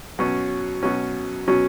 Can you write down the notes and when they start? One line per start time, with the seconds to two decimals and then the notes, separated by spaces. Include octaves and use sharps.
0.19 B2 F#3 C#4
0.83 B2 F#3 C#4
1.48 B2 F#3 C#4